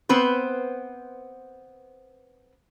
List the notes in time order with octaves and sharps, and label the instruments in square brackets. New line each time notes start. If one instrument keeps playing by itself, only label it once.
[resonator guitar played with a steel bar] B3 C4 B4 C5